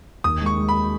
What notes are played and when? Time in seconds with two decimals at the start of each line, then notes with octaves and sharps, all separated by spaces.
0.24 D#2 D#6
0.41 G#3 C#6
0.57 G#3
0.69 B5